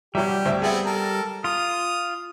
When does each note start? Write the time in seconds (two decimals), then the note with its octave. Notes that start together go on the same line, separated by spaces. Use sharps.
0.15 B2 F#3 G3 G4 E5
0.45 D2 C4 E5
0.62 B3 C4 G#4 E5
0.85 A4 A#4
1.44 F4 D#6